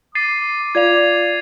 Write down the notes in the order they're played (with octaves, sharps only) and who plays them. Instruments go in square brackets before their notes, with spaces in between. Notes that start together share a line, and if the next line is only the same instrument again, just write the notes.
[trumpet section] D6 [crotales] A6 C7 D#7
[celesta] F4 D5 F5 [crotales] G#6 F7